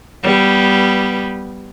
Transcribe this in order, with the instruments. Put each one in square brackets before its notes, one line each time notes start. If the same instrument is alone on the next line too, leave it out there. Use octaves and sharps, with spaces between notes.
[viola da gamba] G3 B3